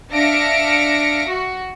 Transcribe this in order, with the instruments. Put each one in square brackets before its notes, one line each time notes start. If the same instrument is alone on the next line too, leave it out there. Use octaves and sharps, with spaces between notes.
[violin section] D4 E5 F5 A#6 C#7 D7
F#4